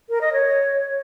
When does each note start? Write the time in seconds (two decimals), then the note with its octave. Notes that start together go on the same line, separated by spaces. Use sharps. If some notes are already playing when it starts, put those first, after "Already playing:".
0.09 A#4
0.21 D#5
0.32 C#5